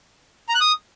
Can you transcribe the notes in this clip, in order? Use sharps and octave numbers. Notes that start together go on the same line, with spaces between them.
A#5
F#6
D#6